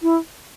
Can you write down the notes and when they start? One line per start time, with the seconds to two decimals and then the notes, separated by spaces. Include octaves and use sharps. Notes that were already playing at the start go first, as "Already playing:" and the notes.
0.03 E4